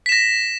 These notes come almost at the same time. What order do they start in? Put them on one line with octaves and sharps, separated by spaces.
B6 E7 A#6